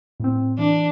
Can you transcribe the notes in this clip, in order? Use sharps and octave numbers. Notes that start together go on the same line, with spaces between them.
A2 C4
E3 D4